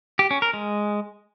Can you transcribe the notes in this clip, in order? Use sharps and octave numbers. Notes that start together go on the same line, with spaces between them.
G4
C#4
A#4
G#3